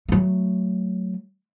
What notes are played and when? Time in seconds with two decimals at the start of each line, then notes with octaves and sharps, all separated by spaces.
0.09 F#3 A3